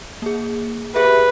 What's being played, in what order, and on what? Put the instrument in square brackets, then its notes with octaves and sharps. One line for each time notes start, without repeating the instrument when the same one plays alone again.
[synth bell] A#3 G#4
[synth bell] G4 G#4 E5 [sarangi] B4